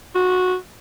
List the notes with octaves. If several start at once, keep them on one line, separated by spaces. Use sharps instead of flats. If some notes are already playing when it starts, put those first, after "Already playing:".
F#4